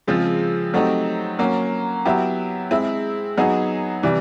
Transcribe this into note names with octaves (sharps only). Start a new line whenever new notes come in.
C#3 F3 G#3 C4 F4
F#3 A3 C4 D#4 G4
F#3 A#3 C#4
F#3 B3 E4 G4
G#3 C4 E4
F#3 B3 D#4 G#4
C3 E3 G3